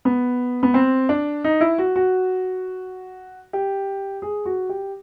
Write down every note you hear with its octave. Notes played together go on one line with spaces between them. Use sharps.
B3
B3
C4
D4
D#4
E4
F#4
F#4
G4
G#4
F#4
G4